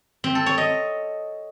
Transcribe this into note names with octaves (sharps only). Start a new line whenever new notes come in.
C4
A4
C#5
D#5